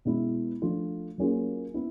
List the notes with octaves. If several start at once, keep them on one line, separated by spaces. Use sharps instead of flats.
B2 G#3 B3 E4
F3 A3 D4 F4
F#3 A#3 C#4 F4 G#4
B3 E4